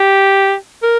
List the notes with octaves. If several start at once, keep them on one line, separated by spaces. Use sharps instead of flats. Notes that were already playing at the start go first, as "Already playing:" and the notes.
Already playing: G4
A#4